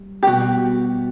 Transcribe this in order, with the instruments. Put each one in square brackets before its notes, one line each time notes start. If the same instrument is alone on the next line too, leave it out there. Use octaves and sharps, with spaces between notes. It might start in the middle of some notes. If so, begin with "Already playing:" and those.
Already playing: [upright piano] G3
[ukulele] G4
[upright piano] B2 G3 B3 [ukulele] F#4